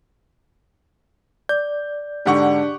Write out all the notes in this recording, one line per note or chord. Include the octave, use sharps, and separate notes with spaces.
D5 G6
G#2 D3 D4 G4 F#5 C#6